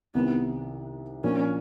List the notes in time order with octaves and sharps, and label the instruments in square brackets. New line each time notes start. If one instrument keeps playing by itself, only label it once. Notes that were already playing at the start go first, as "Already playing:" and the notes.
[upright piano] C2 C3 D#3 [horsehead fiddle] B3
[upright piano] A#2 F3 A#3 D4 F4 [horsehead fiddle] C#4